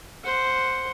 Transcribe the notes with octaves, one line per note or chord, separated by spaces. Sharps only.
C5 F#5